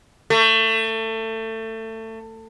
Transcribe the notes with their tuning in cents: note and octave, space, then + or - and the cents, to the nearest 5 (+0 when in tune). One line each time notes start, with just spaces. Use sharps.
A3 +25